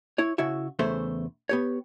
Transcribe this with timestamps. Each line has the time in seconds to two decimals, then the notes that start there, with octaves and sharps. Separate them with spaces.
0.18 E4 C#5
0.38 C#3 E4 F#4 E5
0.79 E2 C#3 A3 C5 E5
1.49 B3 G4 C#5